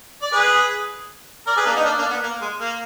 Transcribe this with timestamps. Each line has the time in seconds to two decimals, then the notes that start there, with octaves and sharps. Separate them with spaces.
0.22 D5
0.33 G#4 B4
1.47 A#4 D5
1.57 G#4 B4
1.66 A#3 D4
1.76 B3 D#4
1.85 A#3 D4
1.98 A#3 D4
2.11 B3
2.23 A#3
2.42 G#3
2.61 A#3